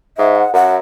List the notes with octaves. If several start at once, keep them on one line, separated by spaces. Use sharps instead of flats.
G#2 E5
F#5
F#2 F#5